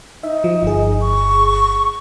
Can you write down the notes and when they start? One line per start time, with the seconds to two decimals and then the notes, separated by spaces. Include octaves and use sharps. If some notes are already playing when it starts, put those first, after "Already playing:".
0.23 D#4 E5
0.44 F3
0.63 G1 G#4
1.01 C#6